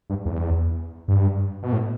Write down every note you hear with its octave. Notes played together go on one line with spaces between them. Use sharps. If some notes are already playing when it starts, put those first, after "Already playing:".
G2
E2
G2
B2
A2